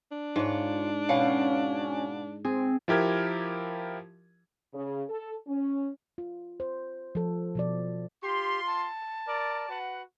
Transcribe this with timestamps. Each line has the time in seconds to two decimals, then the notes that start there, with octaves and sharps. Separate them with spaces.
0.11 D4
0.36 G#2 F4 C#5
1.09 B2 C#4 F5 F#5
2.45 C4 G#4
2.88 F3 E4 G4 A#4 G#6
4.73 C#3
5.09 A4
5.47 C#4
6.18 F4
6.60 C5
7.15 F3 A4
7.55 B2 F3 D5
8.23 F4 G4 C6
8.67 A5
9.26 A#4 D5
9.68 F#4 B4 F#5